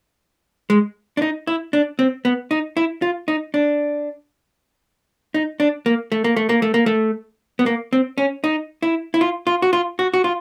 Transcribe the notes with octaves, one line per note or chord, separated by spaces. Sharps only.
G#3
D4
D#4
E4
D4
C4
B3
D#4
E4
F4
D#4
D4
D#4
D4
A#3
A3
A#3
A3
A#3
A3
A#3
A3
B3
A#3
C4
C#4
D#4
E4
E4
F4
F4
F#4
F4
F#4
F#4
F4